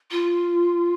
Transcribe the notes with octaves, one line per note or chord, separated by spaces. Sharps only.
F4